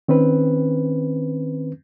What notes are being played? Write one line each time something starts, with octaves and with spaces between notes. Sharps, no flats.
D#3 C4 C#4 B4